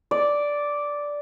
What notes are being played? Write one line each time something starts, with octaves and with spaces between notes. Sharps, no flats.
D5